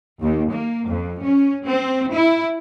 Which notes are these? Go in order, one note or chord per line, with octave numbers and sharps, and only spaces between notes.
D#2
A#3
F2
C#4
C4
E4